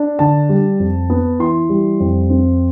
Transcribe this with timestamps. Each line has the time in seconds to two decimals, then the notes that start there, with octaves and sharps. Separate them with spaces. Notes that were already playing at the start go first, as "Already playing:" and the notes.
Already playing: D4
0.19 D3 A5
0.49 G3
0.80 F2
1.10 B3
1.39 E3 C6
1.69 G3
2.00 F2
2.30 C4